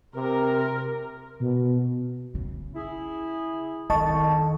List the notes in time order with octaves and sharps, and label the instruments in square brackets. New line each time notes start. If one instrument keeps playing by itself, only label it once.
[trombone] C3 [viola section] A#4
[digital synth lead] B2
[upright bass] C#3
[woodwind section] E4 G#4
[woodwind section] C2 F2 [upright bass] D#3 [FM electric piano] D#5 A5 C#6